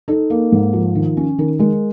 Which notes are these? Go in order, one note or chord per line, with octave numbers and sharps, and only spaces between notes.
D#4 A4
A#3
G#2
F3
D#3
C#4
D#3 A#4
G#3 A#4